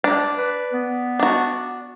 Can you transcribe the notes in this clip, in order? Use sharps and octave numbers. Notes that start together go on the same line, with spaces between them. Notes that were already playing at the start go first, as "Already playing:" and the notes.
D4
B4
B3
D4 F#4